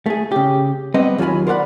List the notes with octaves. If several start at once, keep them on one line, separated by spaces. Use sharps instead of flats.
A3 G#4
C#3 G4
G3 B3 C4 D#5
D#2 F#3 F4 C5 G#5 B5
A#4 C5 D5 F5 F#5 B5